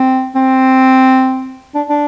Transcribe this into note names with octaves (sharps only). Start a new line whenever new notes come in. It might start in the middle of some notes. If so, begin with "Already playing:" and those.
Already playing: C4
C4
D4
D4